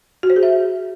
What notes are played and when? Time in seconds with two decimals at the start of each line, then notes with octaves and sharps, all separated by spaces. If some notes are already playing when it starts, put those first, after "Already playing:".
0.23 F#4
0.30 C5
0.36 G#4
0.43 E5